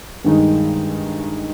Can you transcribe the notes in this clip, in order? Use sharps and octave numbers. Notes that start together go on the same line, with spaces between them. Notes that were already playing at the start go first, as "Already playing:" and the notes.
G2 D#3 G#3 D#4